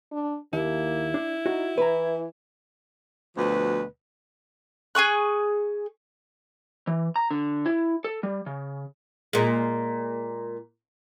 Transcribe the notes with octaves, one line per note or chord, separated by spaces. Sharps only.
D4
D#2 A#3 E4
D4
D#4 F#4
E3 B4 A#5
D2 B2 F3 B4
G#4 G#5 C#6 F#6
E3
A#5
D3
E4
A4
G3
C#3
A#2 G#3